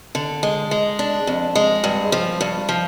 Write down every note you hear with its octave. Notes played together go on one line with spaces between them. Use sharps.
D3
G#3
G#3
D4
F2
G#3
G2
F3
G2
F3